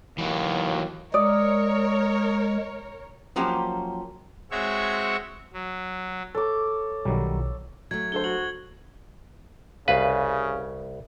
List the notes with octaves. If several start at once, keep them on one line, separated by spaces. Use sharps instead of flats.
D#2 E3 F#3
G#3 A#4 C#5 D5 D#6
F3 F#3 A#3 C#4 G4 C5
G#3 C4 F#4 C#5 E5 C#6
F#3
A4 C#5 D6
B1 D#3 F#3 G3
F#3 A3 G#6
D3 A4 C5 G7
F#4 F#7
C2 C#3 B4 F5